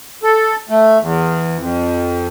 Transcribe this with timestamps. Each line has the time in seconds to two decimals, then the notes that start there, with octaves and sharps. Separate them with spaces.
0.23 A4
0.69 A3
1.00 E2
1.59 F2